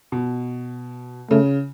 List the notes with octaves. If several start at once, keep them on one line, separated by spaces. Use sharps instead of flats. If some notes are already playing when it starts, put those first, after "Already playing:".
B2
C#3 A3